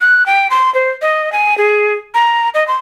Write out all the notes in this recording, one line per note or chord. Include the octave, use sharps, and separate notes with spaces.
F#6
G5
C6
C5
D#5
G#5
G#4
A#5
D#5
C6